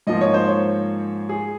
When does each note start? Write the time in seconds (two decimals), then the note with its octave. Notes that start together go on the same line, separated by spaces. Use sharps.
0.07 G#2 F3 A#3 D#5
0.21 C#5
0.34 C5
0.48 C#5
1.29 G#4